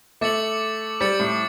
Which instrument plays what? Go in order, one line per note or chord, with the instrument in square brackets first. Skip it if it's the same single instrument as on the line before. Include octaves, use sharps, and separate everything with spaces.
[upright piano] A3 [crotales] D6 A6 C#7 F#7
[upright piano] G3 [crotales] D6 A6 C#7 F#7
[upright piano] A2